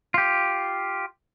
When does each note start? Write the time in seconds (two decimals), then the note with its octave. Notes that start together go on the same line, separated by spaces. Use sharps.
0.14 F4 G4